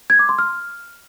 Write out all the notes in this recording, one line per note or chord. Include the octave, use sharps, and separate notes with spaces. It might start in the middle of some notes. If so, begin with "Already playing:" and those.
G#6
D6
C6
F6